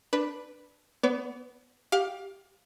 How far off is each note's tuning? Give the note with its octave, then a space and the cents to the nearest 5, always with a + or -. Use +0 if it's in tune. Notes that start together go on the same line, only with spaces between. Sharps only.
D4 +5 B4 +0
B3 +0 B4 +30 D5 -40
G4 +0 F5 +25 D6 +0